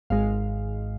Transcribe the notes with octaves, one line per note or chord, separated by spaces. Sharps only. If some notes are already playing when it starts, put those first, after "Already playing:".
G#1 G#2 G#3 F5